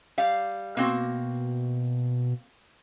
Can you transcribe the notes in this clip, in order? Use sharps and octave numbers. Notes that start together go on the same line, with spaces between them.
G3 F5
B2 A#3 C4 F#4